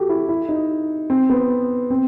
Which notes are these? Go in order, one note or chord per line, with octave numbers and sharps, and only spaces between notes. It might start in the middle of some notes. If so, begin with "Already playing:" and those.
Already playing: F#4 G4 A4
E4
E4
D#4
C4
B3
C4